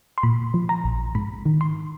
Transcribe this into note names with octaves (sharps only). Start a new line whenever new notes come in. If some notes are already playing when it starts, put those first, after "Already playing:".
C6
A#2 B5
F3
A#5
A#1
G#2 B5
D#3
C6